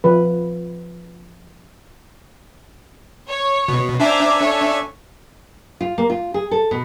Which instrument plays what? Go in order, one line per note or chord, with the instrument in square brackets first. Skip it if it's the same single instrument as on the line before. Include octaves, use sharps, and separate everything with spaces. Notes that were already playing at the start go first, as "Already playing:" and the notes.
[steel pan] F3 B4
[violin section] C#5
[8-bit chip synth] B2
[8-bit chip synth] D4 E5 G#5 [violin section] C5 A#5 D6
[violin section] A4 C#5
[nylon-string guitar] F4
A#3
F4
G#4
A4
B2